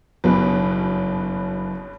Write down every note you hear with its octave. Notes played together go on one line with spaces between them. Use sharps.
F#1 B1 G2 B2 B4